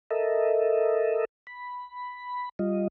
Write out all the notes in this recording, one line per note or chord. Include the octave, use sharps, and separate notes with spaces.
A4 A#4 D#5 E5
B5
G3 F4 D#5